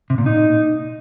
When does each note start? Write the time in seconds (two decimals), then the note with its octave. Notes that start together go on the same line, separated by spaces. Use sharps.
0.10 C3
0.18 A#2
0.26 D#4